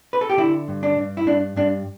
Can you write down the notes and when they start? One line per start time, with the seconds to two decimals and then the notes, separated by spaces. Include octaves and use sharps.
0.13 B4
0.21 A4
0.30 G4
0.37 D3 E4
0.68 G2
0.83 D4
0.98 G2
1.17 E4
1.26 G2 D4
1.56 G2 D4